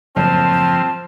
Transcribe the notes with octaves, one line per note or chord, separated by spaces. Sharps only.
F#1 F2 A2 F3 C4 A5